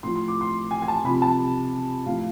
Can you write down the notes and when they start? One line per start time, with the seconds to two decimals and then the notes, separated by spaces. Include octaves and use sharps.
0.03 A2 F3 C6
0.16 C6
0.28 D6
0.41 C6
0.71 G#5
0.82 G#5
0.88 A5
1.04 C3 F3 B5
1.22 A5
2.06 A2 F3 F5